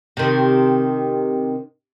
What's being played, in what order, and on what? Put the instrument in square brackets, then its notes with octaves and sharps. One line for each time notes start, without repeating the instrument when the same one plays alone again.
[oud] C3 D#3